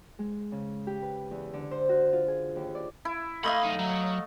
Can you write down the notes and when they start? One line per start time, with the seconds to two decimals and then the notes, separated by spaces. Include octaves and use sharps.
0.19 G#3
0.52 C#3
0.87 G4
1.02 B4
1.31 E2
1.53 D3
1.71 C5
1.89 F#4
2.13 F4
2.28 G#4
2.56 D#2
2.75 D5
3.05 E4
3.44 A3 D#5 F5 B5 C6
3.63 F#3 D#4
3.79 F#3